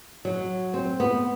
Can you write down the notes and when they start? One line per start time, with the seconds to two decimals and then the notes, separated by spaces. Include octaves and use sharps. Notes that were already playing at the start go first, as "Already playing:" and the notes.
0.25 F#3
0.74 C4
1.00 B3